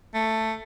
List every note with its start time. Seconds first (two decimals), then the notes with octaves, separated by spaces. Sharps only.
0.14 A3